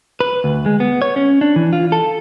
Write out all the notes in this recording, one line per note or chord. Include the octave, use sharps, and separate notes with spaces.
B4
D2
G#3
B3
C#5
C#4
D4
E3
F4
A4